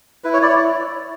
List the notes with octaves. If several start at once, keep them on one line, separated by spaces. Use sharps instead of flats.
E4 B4
C#5
E4 D5
C#5